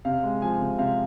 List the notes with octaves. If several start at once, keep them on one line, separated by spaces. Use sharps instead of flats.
C3 F5
G#3
F3 G#5
C3
C3 F5